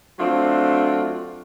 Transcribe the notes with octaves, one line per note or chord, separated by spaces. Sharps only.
F#3 A3 C4 D4 F4